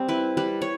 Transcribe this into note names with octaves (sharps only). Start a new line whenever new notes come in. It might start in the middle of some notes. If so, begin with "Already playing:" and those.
Already playing: G3 C4
E4 B4
G3 B4
C#5